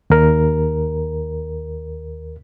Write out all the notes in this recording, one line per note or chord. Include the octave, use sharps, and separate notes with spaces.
D#2 A#4